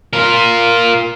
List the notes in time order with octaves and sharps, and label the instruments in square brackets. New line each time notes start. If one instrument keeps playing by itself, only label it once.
[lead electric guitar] F4 A#4